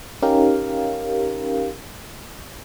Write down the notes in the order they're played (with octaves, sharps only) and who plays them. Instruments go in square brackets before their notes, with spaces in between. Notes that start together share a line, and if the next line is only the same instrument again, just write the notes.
[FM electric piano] C#4 D#4 G4 A#4 F5